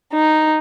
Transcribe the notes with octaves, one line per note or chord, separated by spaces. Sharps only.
D#4